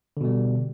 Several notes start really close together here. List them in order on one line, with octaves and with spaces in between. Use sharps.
D3 B2 G3